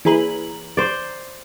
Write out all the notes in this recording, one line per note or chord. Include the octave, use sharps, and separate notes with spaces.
E3 E4 G#4 B4 A#5 F#7
C5 D5